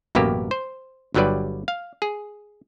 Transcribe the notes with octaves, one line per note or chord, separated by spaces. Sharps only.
A1 F#2 B2 A#3 G4
C5
G1 G2 F#3 G3 B4 D5
F5
G#4